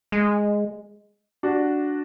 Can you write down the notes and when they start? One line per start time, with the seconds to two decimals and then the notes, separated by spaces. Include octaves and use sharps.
0.12 G#3
1.43 D4 F#4